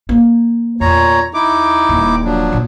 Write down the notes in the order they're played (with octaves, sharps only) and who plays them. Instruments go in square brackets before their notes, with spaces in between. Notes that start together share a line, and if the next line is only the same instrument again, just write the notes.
[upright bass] A#3
[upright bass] E2 [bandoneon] A#2 C#5 A#5
[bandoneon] D#4 E4 D6
[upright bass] D#1
[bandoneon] F3 F#3 D4
[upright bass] A#2